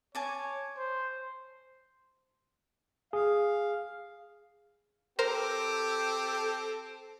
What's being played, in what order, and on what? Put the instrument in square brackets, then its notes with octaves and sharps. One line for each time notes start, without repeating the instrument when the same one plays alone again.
[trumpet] C#5 [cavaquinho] G#5 A5 D6
[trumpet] C5
[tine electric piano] G#4 [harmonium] F5
[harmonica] C4 G4 [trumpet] A4 [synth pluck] A#4 C5